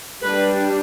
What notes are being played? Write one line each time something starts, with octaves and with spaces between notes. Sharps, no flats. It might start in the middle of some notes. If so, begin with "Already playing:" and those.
G3 D4 B4